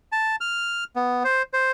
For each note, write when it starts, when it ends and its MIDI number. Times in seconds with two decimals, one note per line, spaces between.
0.12 0.36 81
0.41 0.84 89
0.96 1.23 59
1.24 1.42 72
1.53 1.72 72